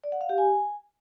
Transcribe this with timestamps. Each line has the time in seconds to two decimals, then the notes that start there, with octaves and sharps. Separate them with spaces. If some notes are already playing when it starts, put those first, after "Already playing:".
0.04 D5
0.12 F#5
0.21 F5
0.29 G4
0.38 G#5